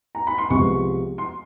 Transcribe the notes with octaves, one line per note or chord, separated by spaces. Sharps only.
A#5
B5
C6
C2 C3 F3 G#3 B3 C#6
C6